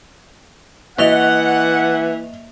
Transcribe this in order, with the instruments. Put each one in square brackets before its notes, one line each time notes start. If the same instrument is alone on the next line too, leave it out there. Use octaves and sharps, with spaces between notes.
[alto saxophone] E3 [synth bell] A#3 E5 F7 [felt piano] D#5 [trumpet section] F#5